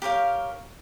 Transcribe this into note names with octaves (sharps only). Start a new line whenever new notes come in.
G4 A#4 C#5 F5